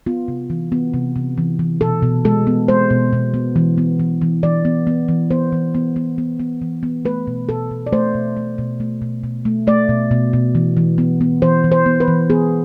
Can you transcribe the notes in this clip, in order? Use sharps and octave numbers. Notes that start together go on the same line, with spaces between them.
B3 F4
C3
E3
B3
C3
C3
E3
E3
B2 A4
B2
G#3 A4
B3
G#3 C5
B2
B2
B3
E3
B3
E3
E3
E3 D5
B3
B3
E3
B3 C5
E3
B3
B3
B3
B3
E3
B3
A3 B4
B2
B2 A4
B2
D5
A3 C5
B2
A3
B2
A3
B2
B2
A3
A3 D5
B2
B2
B2
E3
E3
B3
B3
E3 C5
E3
C5
B3
B4
E3
B3 G#4